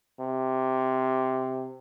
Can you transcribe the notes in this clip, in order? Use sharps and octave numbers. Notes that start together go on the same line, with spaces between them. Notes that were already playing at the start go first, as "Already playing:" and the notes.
C3